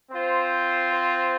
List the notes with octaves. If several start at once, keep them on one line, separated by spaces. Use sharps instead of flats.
C4 F4 C5
C5